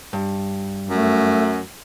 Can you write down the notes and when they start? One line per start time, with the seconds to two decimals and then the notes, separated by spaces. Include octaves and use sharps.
0.13 G2
0.89 F#2 A3